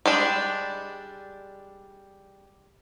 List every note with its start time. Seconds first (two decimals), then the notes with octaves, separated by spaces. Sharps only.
0.06 G3 G#3 D4